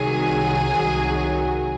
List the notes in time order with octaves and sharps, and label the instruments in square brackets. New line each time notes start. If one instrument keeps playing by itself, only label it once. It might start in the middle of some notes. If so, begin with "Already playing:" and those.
Already playing: [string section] C2 C3 D#3 F#3 G#4
C2 C3 D#3 F#3